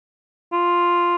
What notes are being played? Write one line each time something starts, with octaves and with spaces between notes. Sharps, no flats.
F4